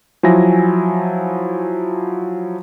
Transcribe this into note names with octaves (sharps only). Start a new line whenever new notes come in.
F3 F#3 E4 G#5 A#6